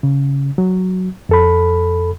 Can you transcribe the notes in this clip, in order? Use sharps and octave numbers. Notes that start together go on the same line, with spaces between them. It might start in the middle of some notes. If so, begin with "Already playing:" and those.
C#3
F#3
F2 A4 B5